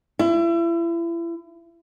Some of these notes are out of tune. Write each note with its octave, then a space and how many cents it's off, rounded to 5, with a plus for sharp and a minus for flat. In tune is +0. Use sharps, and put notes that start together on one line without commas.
E4 +35